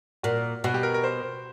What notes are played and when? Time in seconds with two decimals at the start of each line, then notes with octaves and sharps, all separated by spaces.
0.23 A#2 F#4
0.64 B2 F#4
0.74 G4
0.83 A#4
0.94 A#4
1.04 C5